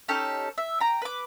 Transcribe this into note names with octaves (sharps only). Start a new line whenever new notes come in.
C#4 D#4 G4 A4
E5
G5 A#5
B4 D6